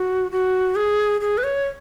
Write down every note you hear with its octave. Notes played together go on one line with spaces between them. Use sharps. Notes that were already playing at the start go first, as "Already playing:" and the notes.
Already playing: F#4
F#4
G#4
G#4
B4
C#5